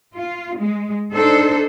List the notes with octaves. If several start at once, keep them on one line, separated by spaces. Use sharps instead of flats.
F4
G#3
D4 D#4 A4 C5